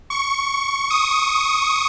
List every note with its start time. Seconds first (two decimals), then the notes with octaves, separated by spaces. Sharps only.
0.10 C#6
0.90 D#6